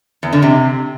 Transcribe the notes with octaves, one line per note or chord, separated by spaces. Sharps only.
E2
D3
C3